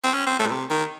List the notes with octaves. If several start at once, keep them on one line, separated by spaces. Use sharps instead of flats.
C4
C#4
C4
A3
A2
C3
D#3